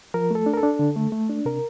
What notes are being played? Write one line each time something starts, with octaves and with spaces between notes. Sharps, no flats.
F3 A#4
A3 A4
D4
A#4
A4
D4
D3
A3
A3
D4
C3 A#4